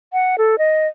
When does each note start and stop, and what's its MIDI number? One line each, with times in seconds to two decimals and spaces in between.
0.13 0.36 78
0.38 0.58 69
0.58 0.87 75